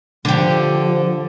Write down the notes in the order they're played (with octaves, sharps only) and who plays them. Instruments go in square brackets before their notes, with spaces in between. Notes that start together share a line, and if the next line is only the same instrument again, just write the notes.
[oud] D3 G4 [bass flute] F3